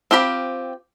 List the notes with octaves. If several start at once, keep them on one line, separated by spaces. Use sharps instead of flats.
C4 F4 G4 B5